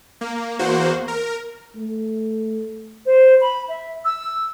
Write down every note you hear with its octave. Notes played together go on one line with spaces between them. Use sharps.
A#3
E2 A#3 F#4 C5
A#4
A3
C5
B5
E5
E6